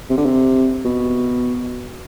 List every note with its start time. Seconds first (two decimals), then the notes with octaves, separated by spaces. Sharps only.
0.10 C3
0.17 D3
0.26 C3
0.85 B2